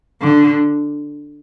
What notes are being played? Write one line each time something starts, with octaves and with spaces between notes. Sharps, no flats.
D3